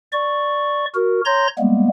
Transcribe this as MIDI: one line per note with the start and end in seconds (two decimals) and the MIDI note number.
0.12 0.85 74
0.12 0.85 85
0.94 1.21 66
0.94 1.21 70
1.25 1.47 73
1.25 1.47 82
1.25 1.47 84
1.25 1.47 91
1.25 1.47 94
1.58 1.88 55
1.58 1.88 56
1.58 1.88 58
1.58 1.88 59